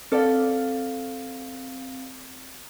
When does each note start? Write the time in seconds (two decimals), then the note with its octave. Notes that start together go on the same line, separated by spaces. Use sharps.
0.12 C4 A4 D5 F5